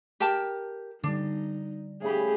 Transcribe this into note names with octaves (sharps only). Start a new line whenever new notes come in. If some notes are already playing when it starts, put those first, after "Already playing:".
G4 A#4 A5
D3 G3 D4 D#4
A2 C#3 G4 G#4 B5